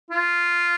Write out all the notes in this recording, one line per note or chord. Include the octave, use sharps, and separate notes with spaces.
F4